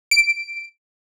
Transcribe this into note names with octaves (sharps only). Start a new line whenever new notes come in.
D7